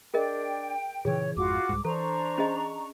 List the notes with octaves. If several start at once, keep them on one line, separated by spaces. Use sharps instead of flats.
D4 G#4 A#4 D#5 G5
A#2 C#3 E3 G#4 C#5
G#1 F2 G#2 F4 F#4 D6
C2 G#2
E3 D4 A4 C5 A#5 C#6
C#4 G#4 D#5